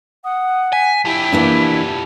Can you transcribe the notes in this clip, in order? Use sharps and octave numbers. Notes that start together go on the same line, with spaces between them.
F#5 D#6
G#5 B6
F3 E4 G4
E3 A#3 D4